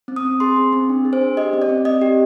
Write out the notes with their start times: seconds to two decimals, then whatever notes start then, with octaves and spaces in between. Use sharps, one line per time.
0.08 C4
0.16 D#6
0.25 C4
0.40 G#4 C6
0.56 C4
0.73 C4
0.89 D4
1.05 G#4
1.13 C5
1.21 D4
1.37 G4 D#5
1.53 C4
1.62 D5
1.69 C4
1.85 C4 D#5
2.01 G4